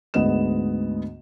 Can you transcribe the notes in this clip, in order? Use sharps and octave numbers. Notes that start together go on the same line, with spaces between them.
D2 G#2 D3 B3 D#5 E7